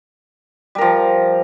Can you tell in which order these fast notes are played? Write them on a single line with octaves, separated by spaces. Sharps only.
G3 A#4 F3